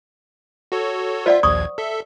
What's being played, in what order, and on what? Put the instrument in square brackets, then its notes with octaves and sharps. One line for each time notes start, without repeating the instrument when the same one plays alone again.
[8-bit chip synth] F#4 A4 C#5
[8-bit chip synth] F4 E5 [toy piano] C5 D5 F#5
[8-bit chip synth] A#1 D#2 G#6 [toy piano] C#6 D#6
[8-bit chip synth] A4 E5